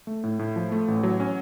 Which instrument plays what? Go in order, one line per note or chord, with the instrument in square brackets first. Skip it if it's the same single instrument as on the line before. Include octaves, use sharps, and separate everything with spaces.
[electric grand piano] A3
A2
A2
F3
A3
A1
F#3
C#4